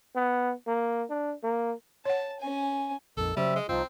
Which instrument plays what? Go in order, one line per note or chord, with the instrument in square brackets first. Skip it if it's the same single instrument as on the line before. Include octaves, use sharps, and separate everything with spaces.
[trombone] B3
A#3
D4
A#3
[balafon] C#5 F#5 [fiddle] A5
[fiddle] C#4 G#5
[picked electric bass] A#1 F2 [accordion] D#3 [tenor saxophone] A4
[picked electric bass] C#3 F#3 C#4 [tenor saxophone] G3 [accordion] C4 E5
[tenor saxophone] G#3
[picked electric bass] D#1 C2 [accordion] F3 D#4 F4 [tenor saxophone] C4